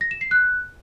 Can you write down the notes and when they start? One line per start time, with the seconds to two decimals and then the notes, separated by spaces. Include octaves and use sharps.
0.01 A#6
0.11 E7
0.21 C7
0.31 F#6